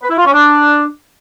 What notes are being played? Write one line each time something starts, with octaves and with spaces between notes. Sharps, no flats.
B4
E4
F4
C#4
D4